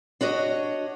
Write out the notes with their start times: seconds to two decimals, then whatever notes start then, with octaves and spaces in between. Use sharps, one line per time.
0.21 D4 F#4 C#5 D#5